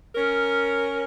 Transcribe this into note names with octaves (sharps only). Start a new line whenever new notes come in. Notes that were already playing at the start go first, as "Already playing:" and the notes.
C#4 A#4